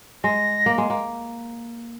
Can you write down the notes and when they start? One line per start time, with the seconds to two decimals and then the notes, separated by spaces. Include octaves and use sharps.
0.24 G#3 A#6
0.66 A#3
0.78 G#3
0.90 A#3